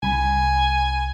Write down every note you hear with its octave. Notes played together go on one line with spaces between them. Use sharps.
C2 G#5 B5